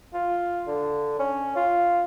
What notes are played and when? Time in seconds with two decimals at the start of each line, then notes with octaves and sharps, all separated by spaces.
0.14 F4
0.68 D3
1.19 C#4
1.56 F4